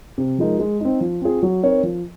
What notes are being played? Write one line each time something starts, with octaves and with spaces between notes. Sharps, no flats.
C3
F3 G#3 D#4 A#4
G#3
C4 D#4
F3
C4 F4 G#4
F#3
C4 D#4 A#4 C#5
F3